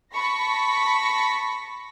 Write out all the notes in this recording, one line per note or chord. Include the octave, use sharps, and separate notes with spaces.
A5 B5 C#6 A#6 B6